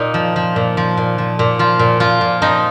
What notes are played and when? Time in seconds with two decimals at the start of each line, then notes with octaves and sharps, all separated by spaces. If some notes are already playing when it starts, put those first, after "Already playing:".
Already playing: A#2 D#4
0.14 F3
0.36 F3
0.56 A#2
0.77 F3
0.97 A#2
1.18 F3
1.39 A#2
1.59 F3 F4
1.79 A#2
2.00 F3 F4
2.21 A#2
2.42 F3 D#4